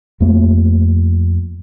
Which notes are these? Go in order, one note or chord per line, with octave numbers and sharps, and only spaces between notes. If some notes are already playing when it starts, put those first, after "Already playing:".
F2 A3 A#3